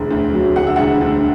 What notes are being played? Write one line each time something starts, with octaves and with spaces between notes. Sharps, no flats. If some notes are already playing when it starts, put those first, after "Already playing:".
Already playing: E1 D2 D3
D2
F#3
D3 F#5
E5
E1 F#5
D2